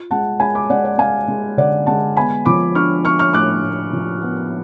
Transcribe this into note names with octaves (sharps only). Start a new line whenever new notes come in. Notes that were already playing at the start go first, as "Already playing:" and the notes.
Already playing: F4
G#3 F#5 A5
G#3 G#5 B5
B5 D6
G#3 D5 F#5
D5 F#5
G#3 F5 G#5
G#3
D3 D5 F#5
G#3 F#5 A5
B3 G#5 B5
F3 B5 D6
D4 C#6 F6
D4 C#6 F6
C#6 F6
A2 D6 F#6
A2
F3
B3